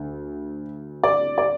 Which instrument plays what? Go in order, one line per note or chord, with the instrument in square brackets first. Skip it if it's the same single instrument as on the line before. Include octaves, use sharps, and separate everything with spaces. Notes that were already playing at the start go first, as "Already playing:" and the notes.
Already playing: [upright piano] D2 D3
D5
D5